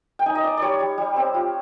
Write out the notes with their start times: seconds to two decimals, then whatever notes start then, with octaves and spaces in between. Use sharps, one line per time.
0.19 G5
0.26 D#4 G#5
0.35 D#5
0.43 D#4 D5
0.57 G3 C#5 D5
0.80 G3
0.98 G3
1.16 C4
1.34 F4